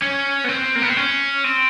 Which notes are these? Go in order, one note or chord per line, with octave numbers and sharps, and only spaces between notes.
C#4
B3
C4
A#3
B3
C4
C#4
C4